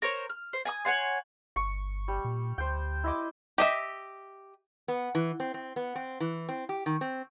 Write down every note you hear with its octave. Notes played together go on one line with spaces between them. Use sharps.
A#4 C5 C#5
F6
C5
G#5 A#5 D#6
C#5 F#5 G#5 C6
G1 C#6
G3
A#2
D2 C5 G5
E4 D#5 D6
G4 D#5 E5
B3
E3
C4
C4
B3
C4
E3
C4
G4
D#3
C4